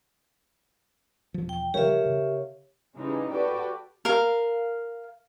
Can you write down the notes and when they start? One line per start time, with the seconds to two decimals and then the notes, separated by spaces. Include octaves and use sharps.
1.34 E1 F3
1.49 G5
1.74 C#3 F3 G3 G4 A#4 C#5 E5 F5
2.06 C#3
2.96 C#3 E3 G3 G#3 D#4
3.30 F#4 G4 A4 B4 D5 G5
4.05 A#4 F5